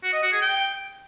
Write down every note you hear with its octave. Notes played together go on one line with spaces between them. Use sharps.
F#4
D#5
F#4
G#4
G5